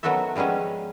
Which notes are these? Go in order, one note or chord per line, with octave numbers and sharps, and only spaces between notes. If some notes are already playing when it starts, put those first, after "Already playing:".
D#3 F#3 B3 F#4 A4 E5
F3 G3 G#3 B3 C#4